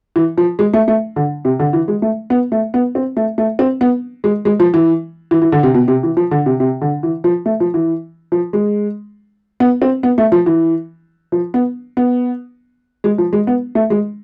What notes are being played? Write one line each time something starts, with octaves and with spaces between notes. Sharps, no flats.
E3
F3
G#3
A3
A3
D3
C3
D3
E3
G#3
A3
B3
A3
B3
C4
A3
A3
C4
B3
G#3
G#3
F3
E3
E3
E3
D3
C3
B2
C3
E3
F3
D3
C3
C3
D3
E3
F3
A3
F3
E3
F3
G#3
B3
C4
B3
A3
F3
E3
F3
B3
B3
G#3
F3
G#3
B3
A3
G#3